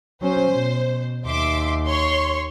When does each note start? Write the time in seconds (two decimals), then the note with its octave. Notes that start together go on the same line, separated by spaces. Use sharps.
0.22 F#3 C#4 C5
0.53 B2
1.26 D#2 E5 C6 D6
1.86 C#5 C6 C#6